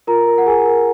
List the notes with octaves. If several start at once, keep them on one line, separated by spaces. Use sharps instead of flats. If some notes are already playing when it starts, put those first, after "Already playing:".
F4 A#4 A#5
A#4
F#5
G#4 A#4 G#5
A#4